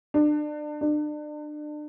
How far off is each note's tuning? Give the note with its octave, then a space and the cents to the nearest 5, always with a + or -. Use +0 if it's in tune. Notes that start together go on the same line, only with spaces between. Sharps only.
D4 +30
D4 +35